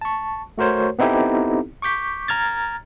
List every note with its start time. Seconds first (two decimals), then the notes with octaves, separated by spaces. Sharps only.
0.01 A5 C#6
0.58 A3 F#4 A#4 C5 C#5
0.99 B3 C4 D#4 E4 G4 A4
1.82 C#6 D6 G6 B6
2.28 A#5 F6 G#6 A6